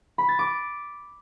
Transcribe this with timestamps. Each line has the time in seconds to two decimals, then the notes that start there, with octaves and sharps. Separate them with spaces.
0.18 B5
0.29 A6
0.39 D6